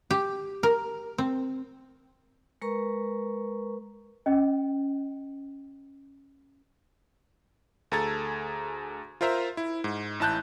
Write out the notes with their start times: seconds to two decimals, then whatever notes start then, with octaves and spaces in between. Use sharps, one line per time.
0.11 G4
0.63 A#4
1.18 C4
2.62 G#3 A#4 B4 A#5 C#6
4.26 C#4 D#5 G5
7.92 D2 G#4 A4 A#5 G#6 A6
9.21 F4 A#4 C5 E5 A#5
9.57 E4
9.84 G#2
10.20 A1 E4 A5 F#6 G6